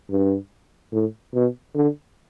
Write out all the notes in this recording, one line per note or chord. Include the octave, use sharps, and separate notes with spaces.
G2
A2
B2
D3